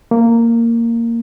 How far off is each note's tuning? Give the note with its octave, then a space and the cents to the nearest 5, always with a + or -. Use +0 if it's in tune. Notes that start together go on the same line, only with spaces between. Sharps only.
A#3 -10